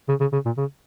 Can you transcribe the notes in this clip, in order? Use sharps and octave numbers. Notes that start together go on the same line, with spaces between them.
C#3
C#3
C#3
A#2
C#3